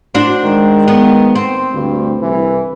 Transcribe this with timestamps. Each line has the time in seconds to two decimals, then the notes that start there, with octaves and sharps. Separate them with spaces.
0.14 A2 C4 D4 F#4
0.45 D#3 G#3
0.88 B3
1.35 C4
1.74 D2 G2
2.22 C2 E3